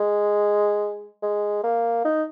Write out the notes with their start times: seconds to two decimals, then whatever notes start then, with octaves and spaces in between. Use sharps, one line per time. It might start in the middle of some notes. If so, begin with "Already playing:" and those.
Already playing: G#3
1.22 G#3
1.63 A#3
2.05 D#4